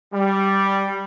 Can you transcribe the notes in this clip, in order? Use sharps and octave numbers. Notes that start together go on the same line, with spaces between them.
G3